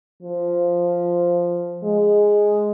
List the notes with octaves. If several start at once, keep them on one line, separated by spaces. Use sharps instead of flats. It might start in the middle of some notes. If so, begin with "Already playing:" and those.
F3
G#3